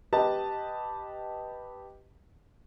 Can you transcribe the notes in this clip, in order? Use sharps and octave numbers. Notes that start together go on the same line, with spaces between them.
G4 B4 D#5 A5